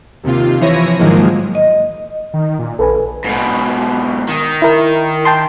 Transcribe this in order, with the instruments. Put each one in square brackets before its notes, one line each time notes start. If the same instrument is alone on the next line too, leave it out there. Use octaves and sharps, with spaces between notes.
[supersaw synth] D#2 C3 F4
E3 F3 E4 C#5 A#6 D#7
G#2 D#3 F3 F#3 G#3 A#3
[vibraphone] D#5
[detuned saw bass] D#3
A#2
[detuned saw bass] A#1 [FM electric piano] A4 B4 G#5
[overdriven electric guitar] G#2 B2
D#3
[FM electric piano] E4 A#4
G5 A5 C6